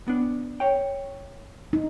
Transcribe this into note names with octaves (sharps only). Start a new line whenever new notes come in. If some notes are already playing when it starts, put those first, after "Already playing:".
B3 D4
C#5 G5
D#4